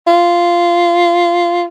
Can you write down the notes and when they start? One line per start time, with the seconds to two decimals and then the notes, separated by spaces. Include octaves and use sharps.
0.07 F4